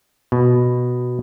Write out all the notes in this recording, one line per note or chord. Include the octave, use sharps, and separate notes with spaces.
B2